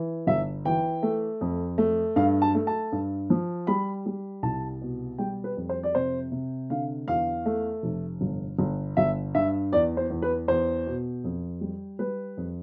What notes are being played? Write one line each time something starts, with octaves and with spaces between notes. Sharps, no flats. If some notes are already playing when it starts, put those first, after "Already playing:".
Already playing: E3
G1 E5
E3 G5
A3
F2
A3
G2 F5
A5
A3
A5
G2
F3
G3 B5
G3
C2 A5
B2
G3 G5
B4
F2
C5
D5
C3 C5
C3
D3 F5
E2 F5
A3
F1
G1
G1
G1 E5
G2 E5
E2 D5
C5
E2
B4
E2 C5
B2
F2
G3
G3 B4
F2